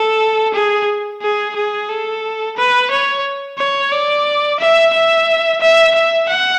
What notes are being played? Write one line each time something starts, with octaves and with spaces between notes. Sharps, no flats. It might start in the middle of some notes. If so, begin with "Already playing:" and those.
Already playing: A4
G#4
G#4
G#4
A4
B4
C#5
C#5
D5
E5
E5
E5
E5
F#5